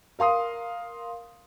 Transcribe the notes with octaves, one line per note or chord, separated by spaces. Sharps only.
A#4 F5 C6 D#6